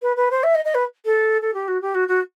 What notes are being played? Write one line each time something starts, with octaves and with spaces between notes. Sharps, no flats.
B4
B4
C5
E5
D#5
D#5
B4
A4
A4
G4
F#4
G4
F#4
F#4